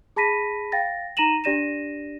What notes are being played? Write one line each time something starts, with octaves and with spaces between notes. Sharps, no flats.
G#4 A5 B5 A#6 B6 D#7
F5 G5 A6 A#6
D#4 A#5 A#6 D#7 E7 F#7
D4 G4 D5 A#6 D#7 E7